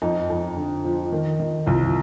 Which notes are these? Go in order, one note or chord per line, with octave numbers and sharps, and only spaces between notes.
F2 D#4
F2
D3
F3
D#3
D#3
C2 F4